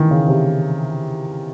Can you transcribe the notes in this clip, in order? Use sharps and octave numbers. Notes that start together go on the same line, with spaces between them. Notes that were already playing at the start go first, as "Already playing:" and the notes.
Already playing: D#3 E3
C#3
C3